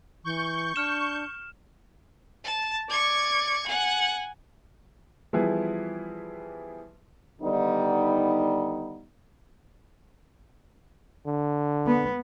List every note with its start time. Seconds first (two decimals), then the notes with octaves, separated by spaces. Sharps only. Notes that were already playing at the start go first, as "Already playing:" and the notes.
0.24 E3 C#6 G6
0.76 D4 F6 E7
2.44 A5
2.89 D5 C#6 G#6
3.68 F#5 G#5
5.33 E3 F3 G3 B3 E4 G#4
7.41 D3 D#3 G3 B3 D#4
11.27 D3
11.86 B3